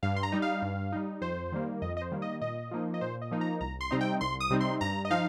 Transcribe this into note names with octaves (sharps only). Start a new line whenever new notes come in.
G2 F5
C6
A#5
G3 D#4
F5
G2
G3 D#4
F2 C5
D#3 G3 A#3
F2 D#5
D#5
C5
D#3 G3 A#3
D#5
A#2 D#5
F3 A#3 D#4
D#5
A#2 C5
D#5
F3 A#3 D#4
A#5
C2 A#5
C6
C3 G3 C4 D#4 A#5
G5
C2 C6
D#6
C3 G3 C4 D#4
C6
G2 A#5
D#5
F3 D#4 F5